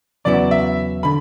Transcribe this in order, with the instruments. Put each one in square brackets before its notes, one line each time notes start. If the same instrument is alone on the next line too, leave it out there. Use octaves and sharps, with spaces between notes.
[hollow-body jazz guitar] E2 C#3 F#3 B3 E4 [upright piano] D5
[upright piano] E5
[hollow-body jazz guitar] D3 [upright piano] B5